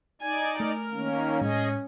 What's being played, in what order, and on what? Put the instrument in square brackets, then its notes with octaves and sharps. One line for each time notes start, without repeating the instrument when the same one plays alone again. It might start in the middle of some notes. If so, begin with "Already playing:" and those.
[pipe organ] D#4 D5 [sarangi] G#5
[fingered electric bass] A3 [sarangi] A#4
[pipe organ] D#3 A#3 C#4
[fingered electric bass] A2 G#3 [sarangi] C#4 [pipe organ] G#4 D#5